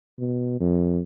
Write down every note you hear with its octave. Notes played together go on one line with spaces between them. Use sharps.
B2
F2